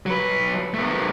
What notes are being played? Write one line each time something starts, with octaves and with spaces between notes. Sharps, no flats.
F#3 B4
A3 B3